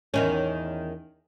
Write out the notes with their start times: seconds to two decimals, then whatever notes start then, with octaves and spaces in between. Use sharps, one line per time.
0.14 E2 D#3 C#4